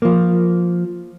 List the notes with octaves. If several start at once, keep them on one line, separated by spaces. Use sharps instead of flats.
F3 A#3